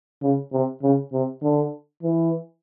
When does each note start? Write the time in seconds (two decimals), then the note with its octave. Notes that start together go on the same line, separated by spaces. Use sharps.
0.23 C#3
0.53 C3
0.82 C#3
1.13 C3
1.43 D3
2.03 E3